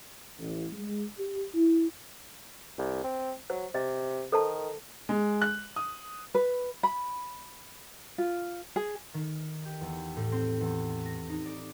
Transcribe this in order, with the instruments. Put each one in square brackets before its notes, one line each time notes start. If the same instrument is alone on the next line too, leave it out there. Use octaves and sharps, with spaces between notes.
[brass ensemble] A1
G#3
G4
E4
[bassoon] C2
C4
[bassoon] F#3 [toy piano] C5
[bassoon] C3 [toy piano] D#5
[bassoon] D#3 [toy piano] A4 C5 A5
[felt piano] G#3
F#6
D#6
[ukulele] B4
B5
F4
G#4
[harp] D#3
G4
E2
A2
C4
E2
A#6
D#4
D5